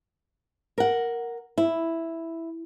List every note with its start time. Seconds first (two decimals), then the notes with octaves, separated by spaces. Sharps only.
0.78 A#4 F#5
1.58 E4